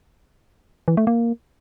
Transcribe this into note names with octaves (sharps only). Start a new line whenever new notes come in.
E3
A3
A#3